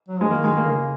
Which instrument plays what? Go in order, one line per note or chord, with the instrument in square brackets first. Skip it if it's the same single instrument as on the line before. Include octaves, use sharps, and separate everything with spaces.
[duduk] F#3
[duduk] F3 [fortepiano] G#3
[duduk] D#3 [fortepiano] A#3
[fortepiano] G#3
A#3
[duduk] D#3
[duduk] C#3 [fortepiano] A#3